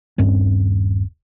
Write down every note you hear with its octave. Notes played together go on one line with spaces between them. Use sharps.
D#1 G2 C4 C#4